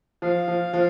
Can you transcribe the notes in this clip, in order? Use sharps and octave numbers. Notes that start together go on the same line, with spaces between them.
F3 F5
F3
F3